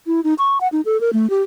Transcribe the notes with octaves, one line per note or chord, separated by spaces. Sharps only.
E4
D#4
C#6
F#5
D#4
A4
A#4
A3
G4